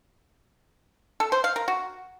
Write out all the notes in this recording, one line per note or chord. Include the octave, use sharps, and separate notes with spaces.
A4
C5
F5
A#4
F#4